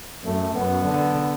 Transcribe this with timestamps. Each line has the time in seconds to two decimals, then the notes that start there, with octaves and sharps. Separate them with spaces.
0.24 F#2 A3
0.55 F#2 B3
0.86 D3